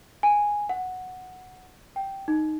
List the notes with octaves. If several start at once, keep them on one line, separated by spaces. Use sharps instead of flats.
G#5
F#5
G5
D#4